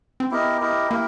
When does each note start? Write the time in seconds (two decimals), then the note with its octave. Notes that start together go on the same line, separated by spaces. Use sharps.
0.20 C4
0.31 B3 E4 G4 A#4 D#5
0.61 E4 G4 A#4 D#5
0.91 A#3 E4 G4 A#4